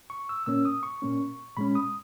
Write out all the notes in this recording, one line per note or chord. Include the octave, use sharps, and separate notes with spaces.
C#6
E6
A#2 A#3 C#4 E6
D#6
C#6
A#2 A#3 C#4
A#2 G#3 C#4 B5
D#6